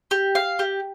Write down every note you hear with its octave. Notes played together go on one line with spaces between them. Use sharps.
G4
F5
G4